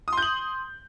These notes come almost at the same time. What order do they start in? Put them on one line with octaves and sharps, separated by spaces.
D#6 C6 G6 F#7